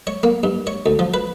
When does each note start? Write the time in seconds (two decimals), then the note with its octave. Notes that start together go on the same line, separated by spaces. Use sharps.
0.07 C#5
0.23 A#3
0.44 G2
0.67 C#5
0.86 D2
0.99 F3
1.14 B4